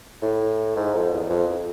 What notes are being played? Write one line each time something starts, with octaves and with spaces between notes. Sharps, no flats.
A2
G#2
F2
E2
F2